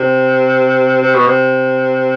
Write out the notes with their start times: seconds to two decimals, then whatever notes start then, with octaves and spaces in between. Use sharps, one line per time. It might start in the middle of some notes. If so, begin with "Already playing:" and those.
Already playing: C3
1.01 C3
1.14 B2
1.26 C3